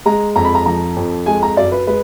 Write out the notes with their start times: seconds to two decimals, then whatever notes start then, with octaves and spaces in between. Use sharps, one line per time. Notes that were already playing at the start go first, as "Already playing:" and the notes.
0.06 G#3 A#5
0.36 F2 A#5
0.45 B5
0.55 A#5
0.66 F3 A#5
0.96 F2
1.26 G#3 G#5
1.43 A#5
1.57 F#2 D5
1.72 B4
1.87 G#3 B4